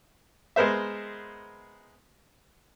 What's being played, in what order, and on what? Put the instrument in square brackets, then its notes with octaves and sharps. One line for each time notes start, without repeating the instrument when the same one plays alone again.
[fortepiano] G#3 B3 A#4 C5 E5